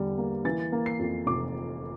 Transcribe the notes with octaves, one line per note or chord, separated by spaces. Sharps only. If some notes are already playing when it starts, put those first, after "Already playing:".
Already playing: E2 D3 G3
A#3
E3 A6
A#3
C7
F2
F1 D6